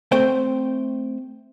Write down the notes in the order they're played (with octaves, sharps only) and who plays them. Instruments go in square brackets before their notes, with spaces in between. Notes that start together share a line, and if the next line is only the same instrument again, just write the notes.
[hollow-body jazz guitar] A3 C4 C5 G5